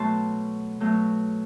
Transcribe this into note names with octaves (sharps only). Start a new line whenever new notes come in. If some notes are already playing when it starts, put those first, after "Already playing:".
Already playing: B2 F#3 A3 A5 C6
B2 F#3 A3